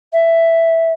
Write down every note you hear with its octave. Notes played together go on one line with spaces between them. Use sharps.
E5